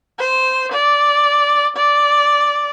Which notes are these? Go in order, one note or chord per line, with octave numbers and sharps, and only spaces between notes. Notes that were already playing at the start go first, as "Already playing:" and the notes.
C5
D5
D5